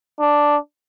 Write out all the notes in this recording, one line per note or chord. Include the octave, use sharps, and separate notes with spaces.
D4